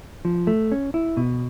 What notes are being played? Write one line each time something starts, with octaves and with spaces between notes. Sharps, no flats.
F3
A3
C#4
E4
B2